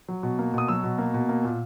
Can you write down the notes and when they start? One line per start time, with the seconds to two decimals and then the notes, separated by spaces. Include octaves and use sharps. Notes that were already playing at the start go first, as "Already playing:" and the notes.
0.09 F#3
0.23 B2
0.39 A#3
0.54 B2 D#6
0.68 F#3 E6
0.83 B2
0.98 A#3
1.14 B2
1.29 A#3
1.44 A#2